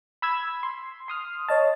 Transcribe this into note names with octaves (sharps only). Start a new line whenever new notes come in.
B5 E6 G#6
C6
C6 D#6 F6
C#5 D#5 A5